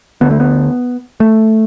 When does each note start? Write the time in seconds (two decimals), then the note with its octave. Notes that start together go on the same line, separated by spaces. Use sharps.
0.21 D2 D3 B3
0.31 A3
0.40 B3
1.20 A3